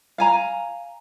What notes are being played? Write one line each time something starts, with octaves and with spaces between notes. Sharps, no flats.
F5 G#5 A#5